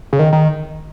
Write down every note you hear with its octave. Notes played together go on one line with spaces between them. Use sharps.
C#3
D#3
D#3